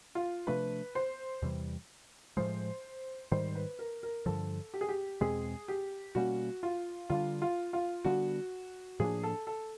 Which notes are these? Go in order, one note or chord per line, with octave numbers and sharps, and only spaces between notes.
F4
C3 F3 A3 D4 B4
C5
E2 C3 E3 G3
A2 F3 G#3 C5
G#2 D#3 G3 C5
B4
A#4
A#4
G2 D3 F3 A4
G4
G#4
G4
E2 B2 G#3 C4 G#4
G4
B2 G3 A#3 C#4 F#4
F4
D3 G3 B3 D4 F4
F4
F4
D3 G3 B3 D4 F#4
A2 F3 A#3 D4 G#4
A4
A4